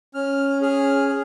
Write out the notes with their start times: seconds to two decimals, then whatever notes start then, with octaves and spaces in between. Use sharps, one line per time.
0.14 C#4 F6
0.62 G#4 F6
1.09 G#4